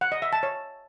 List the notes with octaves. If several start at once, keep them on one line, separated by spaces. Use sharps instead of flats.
F#5
D#5
E5
A5
C#5